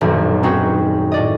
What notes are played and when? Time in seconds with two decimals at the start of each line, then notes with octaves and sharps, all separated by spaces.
0.01 D#1 B1 F#2
0.43 C4 C#4 D#4 F#4 G#4 B4
1.12 A2 D5 D#5